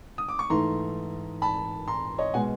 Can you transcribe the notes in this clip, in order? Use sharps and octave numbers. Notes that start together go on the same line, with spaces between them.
D#6
D6
C#6
G#2 E3 A3 A#5 C6
A5 B5
A#5 C6
C#5 D#5
B2 G#3 F#5 G#5